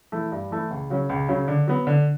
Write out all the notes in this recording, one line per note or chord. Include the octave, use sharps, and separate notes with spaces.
E3 A3 E4
G2
E3 A3 E4
C#2
C#3 F#3 C#4
C#2
C#3 F#3 C#4
D3
F#3 B3
D3